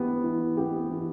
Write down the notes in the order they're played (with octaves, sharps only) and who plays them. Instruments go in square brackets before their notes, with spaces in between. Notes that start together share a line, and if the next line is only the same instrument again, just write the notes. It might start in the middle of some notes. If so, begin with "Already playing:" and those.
Already playing: [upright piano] E3 B3 G4
E3
B3 G4
E3